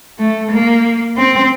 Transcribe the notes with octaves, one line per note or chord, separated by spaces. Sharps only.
A3
A#3
C4